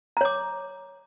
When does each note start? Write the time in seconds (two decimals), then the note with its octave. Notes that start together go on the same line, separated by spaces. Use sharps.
0.17 A#5
0.21 C#5
0.25 D6